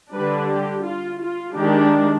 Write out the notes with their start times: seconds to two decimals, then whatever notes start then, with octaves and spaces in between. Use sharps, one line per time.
0.15 D3 G3 D4 B4
0.50 G4
0.85 F4
1.22 F4
1.57 D#3 G#3 D4 G4